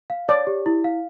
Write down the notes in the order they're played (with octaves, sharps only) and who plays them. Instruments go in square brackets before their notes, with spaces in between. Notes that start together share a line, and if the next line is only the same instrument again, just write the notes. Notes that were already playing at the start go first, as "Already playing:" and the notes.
[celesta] F5
[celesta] C#5 [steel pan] D5
[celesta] G4
E4
F5